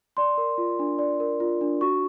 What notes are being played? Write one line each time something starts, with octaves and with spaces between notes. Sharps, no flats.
D5 C6
A#4
F4
D4
D5
A#4
F4
D4
F#4 C#6